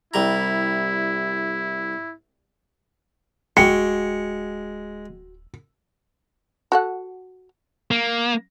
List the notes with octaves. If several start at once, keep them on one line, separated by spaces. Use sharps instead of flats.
C2 G3 E4 A#5
D1 G#3 F#4 G5 C#7
F#4 A4 F#5
A#3